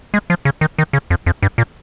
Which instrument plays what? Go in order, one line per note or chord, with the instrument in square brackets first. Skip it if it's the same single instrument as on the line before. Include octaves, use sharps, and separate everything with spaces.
[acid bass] G#3
F3
C#3
D#3
D#3
C#3
F2
F2
G2
A#2